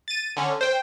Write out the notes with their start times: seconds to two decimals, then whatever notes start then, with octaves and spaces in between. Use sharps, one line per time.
0.08 A6 D#7
0.37 D3 C#4
0.61 C5 G5